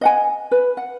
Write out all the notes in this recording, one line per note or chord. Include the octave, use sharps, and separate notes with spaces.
D#5 F#5 G#5
B4
F#5